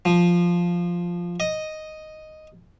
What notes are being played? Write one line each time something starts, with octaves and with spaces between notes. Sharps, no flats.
F3
D#5